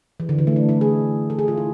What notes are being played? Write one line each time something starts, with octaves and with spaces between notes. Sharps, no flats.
E3
D3
E3
A3
D4
E4
G#4
A4
G#4
F4
E4